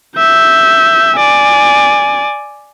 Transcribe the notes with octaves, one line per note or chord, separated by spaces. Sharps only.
E5 G6
D5 G#5